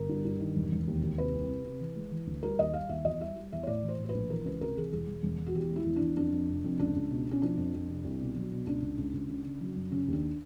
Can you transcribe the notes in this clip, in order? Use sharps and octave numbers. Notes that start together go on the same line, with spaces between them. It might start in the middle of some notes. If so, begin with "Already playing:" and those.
Already playing: G1 A#4
G2
G2
D#3
E1
E1
D#2
D#2
C3 B4
C2
C3
C3
E3
G#3
E3
D2
G3 A#4
D#2 D#5
G3 F5
D#2 E5
E2 D#5
G3 E5
G3
E2 E5
C#5
A2 D5
E3
C5
A2
C5
B4
A#1
E3 A#4
C#2 B4
C3 A#4
E3 G#4
E1 G#4
E1
E1
E1
F#4
E2 G4
G#3
E4
E2
E2 D4
F2 D4
F2
F1
F2
C#2 D4
C#2
B2
B2
C#4
F3 D4
F2
F2
C3
C2
B2
F#3
B2
C#2 D4
C#2
C#2
C#2
C#3
C#3
F#3
F#2
C#3 C#4
D#2 D4